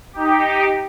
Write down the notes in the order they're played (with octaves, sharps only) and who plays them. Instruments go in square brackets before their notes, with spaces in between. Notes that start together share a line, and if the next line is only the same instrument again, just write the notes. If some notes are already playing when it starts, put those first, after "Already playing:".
[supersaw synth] D#4 G4